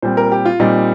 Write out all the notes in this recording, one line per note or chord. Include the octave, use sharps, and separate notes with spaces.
A#2 G3 C4 C5
A#4
G4
F4
A#2 G3 C4 D#4